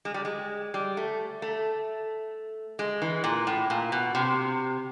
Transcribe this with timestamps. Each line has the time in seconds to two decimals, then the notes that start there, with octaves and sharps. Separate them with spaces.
0.05 G#3
0.14 G3
0.25 G#3
0.74 G3
0.97 A3
1.42 A3
2.79 G#3
3.02 E3
3.24 A#2
3.47 A2
3.70 A#2
3.92 B2
4.15 C3